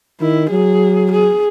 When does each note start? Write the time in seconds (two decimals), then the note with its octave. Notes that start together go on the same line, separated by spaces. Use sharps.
0.21 D#3 E4
0.50 F#3 G#4
1.12 G#4